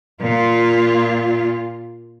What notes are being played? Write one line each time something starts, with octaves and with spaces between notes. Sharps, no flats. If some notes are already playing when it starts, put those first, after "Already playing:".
A#2 F4